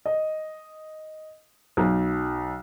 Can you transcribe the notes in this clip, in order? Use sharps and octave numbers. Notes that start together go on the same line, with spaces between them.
D#5
B1